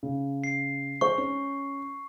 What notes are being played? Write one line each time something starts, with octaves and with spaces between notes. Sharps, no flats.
C#3
C7
G#3 C5 C#6
C#4